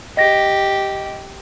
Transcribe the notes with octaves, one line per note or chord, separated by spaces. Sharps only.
G4 D#5 A#6